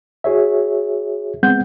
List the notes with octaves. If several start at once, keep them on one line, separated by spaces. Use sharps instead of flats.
F#4 G#4 C#5 E5
G#3 B3 C4 F#5 G6